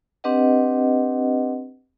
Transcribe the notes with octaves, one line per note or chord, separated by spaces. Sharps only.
C4 D4 G4 B4 D#5 F#5